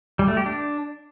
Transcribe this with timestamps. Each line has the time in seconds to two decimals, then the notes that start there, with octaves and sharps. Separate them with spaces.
0.19 G3
0.28 A3
0.37 G4
0.46 D4